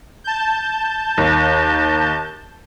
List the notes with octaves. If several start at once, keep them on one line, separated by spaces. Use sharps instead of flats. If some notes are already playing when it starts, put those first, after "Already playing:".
A5 G6
D#2